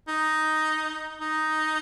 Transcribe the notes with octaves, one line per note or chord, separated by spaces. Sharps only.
D#4
D#4